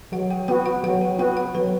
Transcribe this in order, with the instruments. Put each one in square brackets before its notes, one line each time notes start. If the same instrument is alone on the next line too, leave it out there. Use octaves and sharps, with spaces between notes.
[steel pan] F#3 [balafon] F#5
[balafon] G5
[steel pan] B3 F#4 [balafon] G5
[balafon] F#5
[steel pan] F#3 [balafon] F#5
[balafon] G5
[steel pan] B3 F#4 [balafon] G5
[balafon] F#5
[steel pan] F#3 [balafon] B4